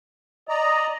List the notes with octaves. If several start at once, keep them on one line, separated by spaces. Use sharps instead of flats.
D5 D#5 A#5